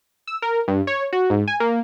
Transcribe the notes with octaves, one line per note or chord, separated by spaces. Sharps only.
E6
A#4
G2
C#5
F#4
G#2
G#5
A#3